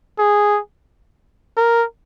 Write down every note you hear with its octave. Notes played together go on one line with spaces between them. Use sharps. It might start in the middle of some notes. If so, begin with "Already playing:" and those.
G#4
A#4